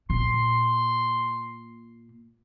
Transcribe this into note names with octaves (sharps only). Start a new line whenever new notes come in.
A#2 C6